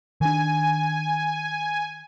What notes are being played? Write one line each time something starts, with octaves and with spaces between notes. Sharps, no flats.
D#3 D4 G#5